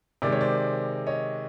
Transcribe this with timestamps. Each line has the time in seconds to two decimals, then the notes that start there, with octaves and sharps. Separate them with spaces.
0.22 C3 D#3 G#3 D5
0.32 C#5
0.41 C5 D5
1.07 C#5 D#5